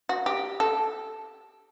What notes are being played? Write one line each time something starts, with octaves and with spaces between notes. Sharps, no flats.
F#4
G4
A4